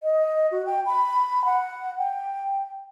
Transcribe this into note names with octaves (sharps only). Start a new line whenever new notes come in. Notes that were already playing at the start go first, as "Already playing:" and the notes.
D#5
F#4
G5
B5
F#5
G5